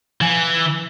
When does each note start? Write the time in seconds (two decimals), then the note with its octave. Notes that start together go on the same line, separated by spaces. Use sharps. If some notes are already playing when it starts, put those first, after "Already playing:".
0.21 E3 F3 G#5